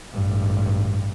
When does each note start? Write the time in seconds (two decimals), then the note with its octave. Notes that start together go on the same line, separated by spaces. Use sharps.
0.14 A1 G2